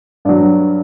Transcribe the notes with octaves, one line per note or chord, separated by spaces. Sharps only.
G2 F#3 D5